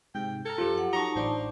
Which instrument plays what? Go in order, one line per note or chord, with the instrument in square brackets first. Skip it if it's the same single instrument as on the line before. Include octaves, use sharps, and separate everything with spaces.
[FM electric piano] G#2 C3 [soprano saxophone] G5
[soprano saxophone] A4 [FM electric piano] A#5 F6 G#6
[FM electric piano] F#2 F3 [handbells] F4 G4
[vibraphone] F#5
[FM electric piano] F#3 [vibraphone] D#4 A5 [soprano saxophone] A#5 [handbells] C#6 C#7
[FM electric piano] A1 D4 D6 [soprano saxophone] C5